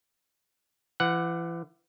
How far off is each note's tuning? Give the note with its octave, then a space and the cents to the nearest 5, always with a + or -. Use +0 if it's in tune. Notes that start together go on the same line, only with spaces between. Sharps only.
E3 +35 F#5 +0